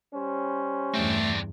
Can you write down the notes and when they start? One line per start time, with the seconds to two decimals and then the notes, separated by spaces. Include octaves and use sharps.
0.14 G3 C#4 C5
0.94 E2 G2 A3 C4 D4